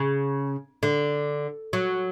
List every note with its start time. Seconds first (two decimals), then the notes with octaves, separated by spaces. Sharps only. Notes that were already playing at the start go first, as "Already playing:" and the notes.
Already playing: C#3
0.83 D3
1.73 F#3